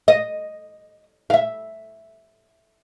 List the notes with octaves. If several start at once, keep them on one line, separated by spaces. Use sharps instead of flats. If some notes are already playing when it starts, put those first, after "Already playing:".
D#5
E5 F5